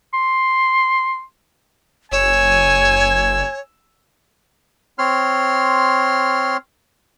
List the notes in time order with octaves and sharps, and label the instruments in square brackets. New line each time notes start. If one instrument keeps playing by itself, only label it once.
[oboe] C6
[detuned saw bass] F#1 [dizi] C#5 [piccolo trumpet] G#5 [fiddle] E6
[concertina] C4 C#5 C6 F6